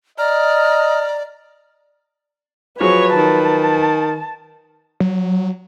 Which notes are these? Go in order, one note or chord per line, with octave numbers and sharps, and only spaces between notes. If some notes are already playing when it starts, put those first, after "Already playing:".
D5 D#5 A#5 F6
F3 F#3 G#4 B4 C#5
D#3 A5
F#3